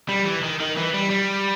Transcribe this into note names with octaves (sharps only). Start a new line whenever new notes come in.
G3
E3
D#3
D#3
E3
G3
G3